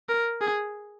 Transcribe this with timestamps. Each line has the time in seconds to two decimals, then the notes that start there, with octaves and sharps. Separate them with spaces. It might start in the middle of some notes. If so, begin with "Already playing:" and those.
0.09 A#4
0.41 G#4